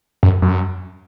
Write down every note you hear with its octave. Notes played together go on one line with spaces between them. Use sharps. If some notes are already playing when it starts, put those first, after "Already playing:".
F#2
F#2